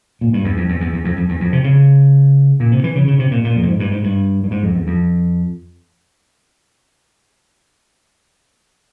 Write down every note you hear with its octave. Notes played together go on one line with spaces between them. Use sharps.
A#2
G2
E2
F2
E2
E2
E2
F2
F2
E2
F2
C3
C#3
A#2
C3
E3
C#3
C#3
C3
A#2
A#2
F2
A#2
G#2
G2
G#2
G2
G2
G#2
F2
E2
F2